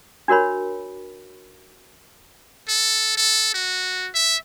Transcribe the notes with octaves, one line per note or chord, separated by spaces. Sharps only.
D4 F#4 A#4 C#5 B5
A4
A4
F#4
E5